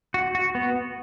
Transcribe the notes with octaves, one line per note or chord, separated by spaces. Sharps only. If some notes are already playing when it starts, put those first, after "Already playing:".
F#4
F#4
B3